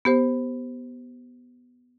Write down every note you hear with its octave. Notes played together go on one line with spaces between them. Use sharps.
B3 G4 C5